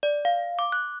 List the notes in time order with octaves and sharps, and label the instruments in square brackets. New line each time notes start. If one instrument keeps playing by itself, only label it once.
[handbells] D5
F5
D6
F#6